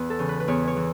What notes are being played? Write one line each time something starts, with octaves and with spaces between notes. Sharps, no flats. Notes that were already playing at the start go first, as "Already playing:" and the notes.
Already playing: E2 B4
A4
C#3 E3
B4
B4
E2 C#5
C#5
E3